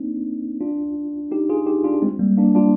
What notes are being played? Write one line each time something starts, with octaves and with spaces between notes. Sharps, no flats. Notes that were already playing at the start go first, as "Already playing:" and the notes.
Already playing: A#3 C4 D4 D#4
D4 F4
D#4 G4
F4 G#4
D#4 G4
D4 F4
G#3 C4
G3 A#3
A#3 D4
D4 F4